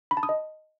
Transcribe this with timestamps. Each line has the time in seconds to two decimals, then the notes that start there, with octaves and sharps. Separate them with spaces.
0.11 B5
0.17 A5
0.23 D#6
0.29 D#5